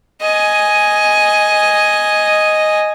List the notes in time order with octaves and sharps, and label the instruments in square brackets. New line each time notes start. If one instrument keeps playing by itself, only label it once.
[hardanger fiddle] D#5 G#5